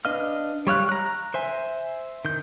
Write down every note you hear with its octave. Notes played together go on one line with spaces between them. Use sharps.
D4 B4 D#5 F5 F6
G3 C#5 F5 F#6
A#5 F#6
C5 E5 G#5
D#3 G6